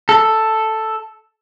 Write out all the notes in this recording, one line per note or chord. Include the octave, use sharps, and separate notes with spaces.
A4